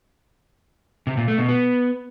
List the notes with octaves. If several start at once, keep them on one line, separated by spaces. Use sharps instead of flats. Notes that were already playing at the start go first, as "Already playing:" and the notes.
C3
A#2
A3
B2
B3